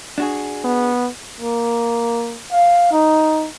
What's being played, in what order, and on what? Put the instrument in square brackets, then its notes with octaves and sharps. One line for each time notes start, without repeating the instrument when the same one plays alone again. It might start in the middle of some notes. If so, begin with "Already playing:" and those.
[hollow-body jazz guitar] D4 F#4 G#4
[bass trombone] B3
[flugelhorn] A#3
F5
D#4